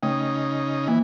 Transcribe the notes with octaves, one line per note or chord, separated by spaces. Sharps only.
C#3 A3 D#4
E3 A#3